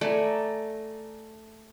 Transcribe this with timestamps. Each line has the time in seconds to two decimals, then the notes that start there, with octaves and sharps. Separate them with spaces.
0.01 A3 D5 G#5 A#5